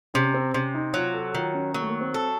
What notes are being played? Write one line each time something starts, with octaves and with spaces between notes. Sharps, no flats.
C3 C#4
C4
C3 C#4
D#4
F#3 F4
A4
D#3 F4
C#4
F#3 A#3
A3
A#3
C4
A4